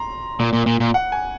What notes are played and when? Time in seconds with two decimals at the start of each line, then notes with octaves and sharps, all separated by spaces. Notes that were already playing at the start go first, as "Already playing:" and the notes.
Already playing: A#5 C6
0.40 A#2
0.53 A#2
0.66 A#2
0.80 A#2
0.94 F#5
1.12 G#5